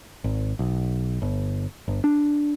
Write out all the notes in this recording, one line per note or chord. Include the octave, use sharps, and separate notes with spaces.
G#1
B1
G1
G1
D4